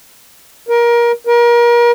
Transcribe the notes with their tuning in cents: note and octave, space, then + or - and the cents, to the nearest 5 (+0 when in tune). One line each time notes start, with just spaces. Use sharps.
A#4 +25
A#4 +35